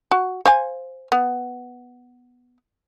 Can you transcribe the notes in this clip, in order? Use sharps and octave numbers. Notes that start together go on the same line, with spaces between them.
F#4
C5 F5 G#5
B3